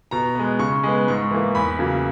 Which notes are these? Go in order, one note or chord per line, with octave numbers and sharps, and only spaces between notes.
B2 A#5
G#3 B3
C#3 C#6
G#3 B3
G#2 C#6
E3 A#3
E2 B5
C#3 F#3 A#3